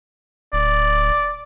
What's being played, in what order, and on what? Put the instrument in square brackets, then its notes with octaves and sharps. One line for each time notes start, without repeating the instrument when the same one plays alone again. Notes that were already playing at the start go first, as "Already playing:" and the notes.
[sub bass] D1 [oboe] D5